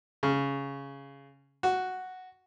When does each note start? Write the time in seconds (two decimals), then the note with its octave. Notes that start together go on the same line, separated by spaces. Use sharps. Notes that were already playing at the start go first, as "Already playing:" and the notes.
0.23 C#3
1.63 F#4